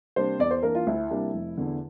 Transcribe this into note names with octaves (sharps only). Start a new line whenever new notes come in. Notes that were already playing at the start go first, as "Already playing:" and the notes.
C3 G3 A#3 D4 C5
E2 D5
C5
E3 A#3 D4 A#4
F4
D2 E4
C3 G3 A#3 D4
F1
E2 D3